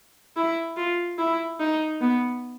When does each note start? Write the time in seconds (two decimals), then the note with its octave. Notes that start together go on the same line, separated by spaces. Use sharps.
0.36 E4
0.77 F4
1.18 E4
1.60 D#4
2.01 B3